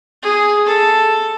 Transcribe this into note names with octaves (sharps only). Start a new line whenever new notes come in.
G#4
A4